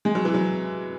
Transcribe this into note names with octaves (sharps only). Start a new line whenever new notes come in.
G#3
F#3
E3
F#3